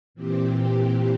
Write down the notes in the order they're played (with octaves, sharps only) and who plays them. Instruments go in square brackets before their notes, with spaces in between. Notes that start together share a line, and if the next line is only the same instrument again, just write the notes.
[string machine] A#2 E3 C4 G4